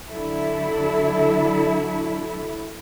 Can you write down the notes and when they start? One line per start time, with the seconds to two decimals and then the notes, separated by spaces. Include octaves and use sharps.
0.11 D3 F#3 E4 A4